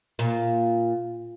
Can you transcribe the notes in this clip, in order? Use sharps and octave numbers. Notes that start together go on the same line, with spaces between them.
A#2